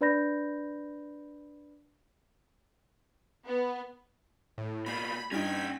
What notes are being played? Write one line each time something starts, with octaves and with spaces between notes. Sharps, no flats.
D4 B4 D5 B5 G6 A#6
B3
A2
B2 A#3 B5
G2 C#4 D#4 G5 G#6 B6